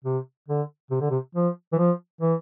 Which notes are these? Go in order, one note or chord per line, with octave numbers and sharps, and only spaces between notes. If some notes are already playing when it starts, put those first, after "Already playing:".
C3
D3
C3
D3
C3
F3
E3
F3
E3